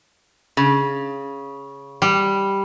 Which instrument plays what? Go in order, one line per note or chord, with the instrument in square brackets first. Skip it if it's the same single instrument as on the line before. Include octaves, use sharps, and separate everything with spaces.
[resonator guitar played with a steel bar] C#3
[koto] G3